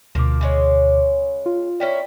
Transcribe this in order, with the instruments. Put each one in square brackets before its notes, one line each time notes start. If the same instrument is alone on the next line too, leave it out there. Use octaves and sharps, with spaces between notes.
[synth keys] D2 B2 D6 [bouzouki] F3 A#3
[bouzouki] C#3 G#3 C#5
[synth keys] F4
[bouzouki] C#4 E4 A#4 [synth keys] D5 G5 B6